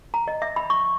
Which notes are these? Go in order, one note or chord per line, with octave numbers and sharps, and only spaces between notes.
A#5
D#5
E5
B5
C#6